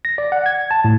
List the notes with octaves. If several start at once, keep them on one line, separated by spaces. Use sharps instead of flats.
A#6
D5
F#5
G#6
A5
A2